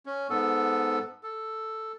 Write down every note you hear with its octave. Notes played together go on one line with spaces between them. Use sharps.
C#4
G#2 B3 A4
A4